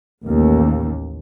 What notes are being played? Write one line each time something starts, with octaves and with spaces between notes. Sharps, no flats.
A1 D#2